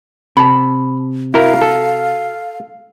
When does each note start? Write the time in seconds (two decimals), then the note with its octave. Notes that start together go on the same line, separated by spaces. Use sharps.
0.37 C3 A5 B5
1.34 E4 F#4 A#4 F5
1.61 A4